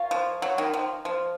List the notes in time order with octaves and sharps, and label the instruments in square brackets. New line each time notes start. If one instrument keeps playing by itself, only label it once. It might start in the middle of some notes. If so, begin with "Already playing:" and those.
Already playing: [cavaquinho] F4 A#4 C#5 F5
[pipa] F3
F#3
D#3
F3
F3